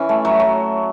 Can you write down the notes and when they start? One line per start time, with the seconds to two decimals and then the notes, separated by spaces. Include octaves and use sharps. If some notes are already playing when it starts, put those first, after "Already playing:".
Already playing: E3 C#4
0.09 A3
0.25 F#3
0.40 F#3